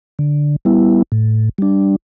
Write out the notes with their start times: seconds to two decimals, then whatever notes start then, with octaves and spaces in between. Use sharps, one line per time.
0.19 D3
0.65 G3 B3 E4
1.12 A2
1.58 G3 D4